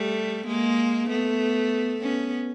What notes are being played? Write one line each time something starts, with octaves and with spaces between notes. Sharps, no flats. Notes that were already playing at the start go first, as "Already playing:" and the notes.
Already playing: G3 A3
G#3 A#3
A3 B3
B3 C#4